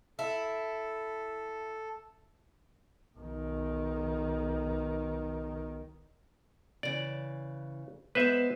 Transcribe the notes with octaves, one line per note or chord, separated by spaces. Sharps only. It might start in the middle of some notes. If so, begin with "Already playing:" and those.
E4 A4
B1 D#3
C#3 E3 D5
G#3 B3 B4 C5 E5